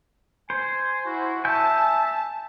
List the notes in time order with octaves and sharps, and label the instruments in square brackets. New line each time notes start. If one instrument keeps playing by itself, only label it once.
[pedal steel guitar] C5 [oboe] G#5
[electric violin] E4 [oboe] F#4
[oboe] E5 [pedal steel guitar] G#5 G6 [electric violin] A5